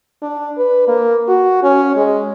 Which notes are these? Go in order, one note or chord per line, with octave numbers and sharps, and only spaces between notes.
D4
B4
A#3
F#4
C#4
G#3